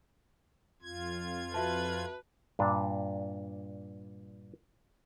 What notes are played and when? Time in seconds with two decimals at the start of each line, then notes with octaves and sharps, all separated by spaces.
0.82 F2 F4 G#6
1.54 F#4 B4 E5 A5
2.59 G2 A#2 D4